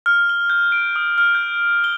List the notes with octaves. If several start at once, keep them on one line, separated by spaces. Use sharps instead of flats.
F6
G7
G6
D7
D#6
F6
G6
G7